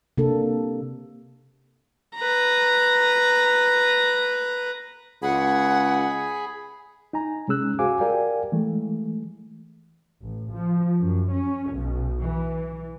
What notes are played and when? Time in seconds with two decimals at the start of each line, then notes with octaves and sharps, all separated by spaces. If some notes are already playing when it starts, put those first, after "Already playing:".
0.18 C3 A#3 D4 A4
2.16 B4 A#5
5.22 C#2 G#4 F#5 G#5 B5
7.13 D#4 G#5 A#5
7.48 C3 G#3 C#4 G#4 E6 F#6
7.79 F#4 G#4 C5 F5 G#5 D6
7.99 G4 A#4 D5 F5 G5 G#5
8.52 E3 G#3 A3
10.22 A1
10.53 F3
11.00 F#2
11.32 C#4
11.73 B1
12.21 E3